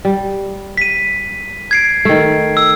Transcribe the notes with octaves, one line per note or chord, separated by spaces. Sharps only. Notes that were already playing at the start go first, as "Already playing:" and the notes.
G3
B6 D#7
G#6 C7 D7
D#3 A3
E6